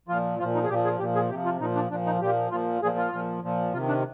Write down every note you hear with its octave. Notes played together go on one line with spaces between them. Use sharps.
A#2 F3 F4
A#2 F3 F4
D#4
G#4
A#2 F3 G4
G#4
A#2 F3 G4
G#4
C3 F3 G4
F4
A#2 F3 D#4
D4
A#2 F3 D4
D#4
A#2 F3 G4
A#2 F3 F4
A#2 F3 G#4
F4
A#2 F3
A#2 F3
C3 D#3 F4
D4